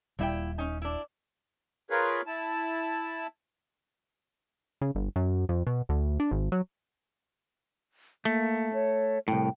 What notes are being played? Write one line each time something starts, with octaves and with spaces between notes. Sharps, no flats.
D#1 A#2 G3 E4 G5
C#4 D#4
D4 E4
F4 G#4 A#4 B4 C#5
E4 A5
C#3
G1
F#2
F2
B2
D2
D4
G#1
F#3
A3 A#3
C#5
C2 A2 G5